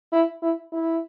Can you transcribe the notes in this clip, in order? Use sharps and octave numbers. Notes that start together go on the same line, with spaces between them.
E4
E4
E4